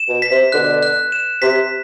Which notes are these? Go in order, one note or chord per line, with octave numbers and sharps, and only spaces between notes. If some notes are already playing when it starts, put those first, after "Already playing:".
Already playing: E7
B2
B6
C3
B2 D3 F#6
F#6
E7
C3 B6